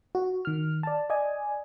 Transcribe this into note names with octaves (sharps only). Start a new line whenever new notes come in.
F#4
D#3 F6
D5 A5
D5 D#5 G#5